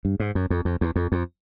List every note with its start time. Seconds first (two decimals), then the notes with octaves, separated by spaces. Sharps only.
0.05 G2
0.20 G#2
0.35 F#2
0.50 F2
0.65 F2
0.81 E2
0.96 F2
1.12 F2